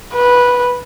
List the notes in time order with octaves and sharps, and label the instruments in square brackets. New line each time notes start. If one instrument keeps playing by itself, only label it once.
[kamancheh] B4